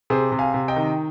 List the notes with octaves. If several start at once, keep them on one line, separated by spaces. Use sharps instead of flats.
C3 G#4 C5
C3
F5 G#5
C3
D#5 G5
D#3